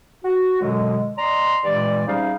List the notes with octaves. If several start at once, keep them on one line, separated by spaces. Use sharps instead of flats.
F#4
F#2 B2 D3 F#3 G#3
D5 D#5 A#5 C6
G2 A#2 E3 G#3 D5
C3 G3 C#4 D#4 G#4 F5